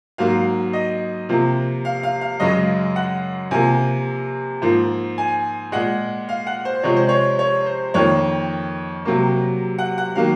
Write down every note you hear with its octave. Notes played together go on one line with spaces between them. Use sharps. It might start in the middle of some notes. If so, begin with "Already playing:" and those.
G#2 F#3 A#3 F5
D#5
C3 F3 A#3
F5
F5
F5
F#2 C#3 G#3 D#5
F#5
C3 F3 A#3 G#5
G#2 F3 A#3
G#5
A#2 G#3 F#5
F5
F#5
C5
C3 F3 G#3 C#5
C5
C#5
C#5
C5
F2 D#3 A#3 C#5
C3 F#3 A#3
F#5
F#5
D#3 F#3 A#3 F5